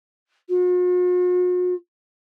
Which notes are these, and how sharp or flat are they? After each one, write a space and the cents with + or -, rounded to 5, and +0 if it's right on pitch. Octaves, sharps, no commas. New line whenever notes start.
F#4 -45